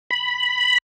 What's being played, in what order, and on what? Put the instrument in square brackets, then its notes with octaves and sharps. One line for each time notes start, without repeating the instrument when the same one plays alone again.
[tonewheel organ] B5